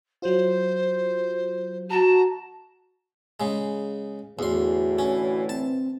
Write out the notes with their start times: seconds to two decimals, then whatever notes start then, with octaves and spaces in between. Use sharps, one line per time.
0.22 F#3 F4 C5
1.90 F#4 A5 A#5
3.40 C#3 G#3
4.39 E2 A2 D3 E3 F#4 C6
4.99 C#4
5.49 C4 A5